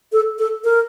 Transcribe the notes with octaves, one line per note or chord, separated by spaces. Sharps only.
A4
A4
A#4